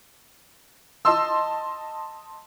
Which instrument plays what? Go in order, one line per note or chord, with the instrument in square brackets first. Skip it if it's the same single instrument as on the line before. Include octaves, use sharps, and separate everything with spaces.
[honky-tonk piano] D#5 A5 C6 E6